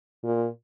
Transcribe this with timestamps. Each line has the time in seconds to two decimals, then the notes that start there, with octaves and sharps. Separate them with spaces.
0.24 A#2